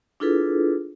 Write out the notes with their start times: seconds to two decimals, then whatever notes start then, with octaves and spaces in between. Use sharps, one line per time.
0.20 D4 E4 F4 G#4 A4 B4